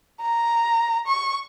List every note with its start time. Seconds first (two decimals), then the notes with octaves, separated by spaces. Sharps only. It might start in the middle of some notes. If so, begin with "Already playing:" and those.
0.22 A#5
1.07 C#6